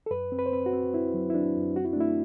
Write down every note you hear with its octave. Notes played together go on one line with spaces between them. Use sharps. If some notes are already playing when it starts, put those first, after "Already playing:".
A4
F#2 B4
C4
B4
C5
C4 B4
F#4
C4
C4 E4
F#3
E4
F#3 D4
F#2
C4 F#4
E4
D4
A3 E4